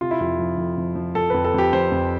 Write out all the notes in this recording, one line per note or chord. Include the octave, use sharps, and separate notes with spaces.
C3 F4
E4
F2 F4
F3
F2
F2
F3
F3 A4
F2 B4
A4
F2 G4
F2 C5
F2